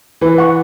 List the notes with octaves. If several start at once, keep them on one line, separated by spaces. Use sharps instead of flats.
E3 B4
F#5 C#6